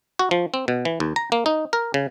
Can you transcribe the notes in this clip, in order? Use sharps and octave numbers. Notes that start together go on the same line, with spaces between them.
F#4
F3
C4
B2
E3
D#2
A#5
A#3
D#4
A#4
C#3